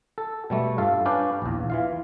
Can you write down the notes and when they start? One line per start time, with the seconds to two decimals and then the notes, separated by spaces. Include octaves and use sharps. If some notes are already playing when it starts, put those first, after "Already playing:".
0.18 A4
0.50 B2 G3 A3
0.78 G2 F4 A4 F5
1.05 C#4 D4 B4 D5 F5 G5
1.42 A#1 E2
1.70 E3 F4 F5